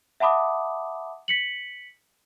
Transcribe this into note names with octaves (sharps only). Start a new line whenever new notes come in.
E5 F#5 A5 B5 D6 D#6
B6 C#7 F#7